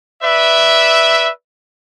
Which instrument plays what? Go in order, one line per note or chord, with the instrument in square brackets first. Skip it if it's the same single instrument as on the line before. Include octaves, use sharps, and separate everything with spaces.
[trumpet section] B4 D5 E5